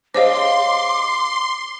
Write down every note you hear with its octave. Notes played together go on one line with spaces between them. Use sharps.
D4 G#4 C5 C#5 D#5 F5 C6 D6